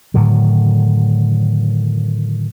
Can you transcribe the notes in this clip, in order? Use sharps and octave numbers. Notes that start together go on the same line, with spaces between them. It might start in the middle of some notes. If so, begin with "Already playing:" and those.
A2 D3 D#3 F#3